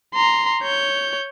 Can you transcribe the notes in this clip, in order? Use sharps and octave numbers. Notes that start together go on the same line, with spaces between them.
A#5 C6
C#5 G6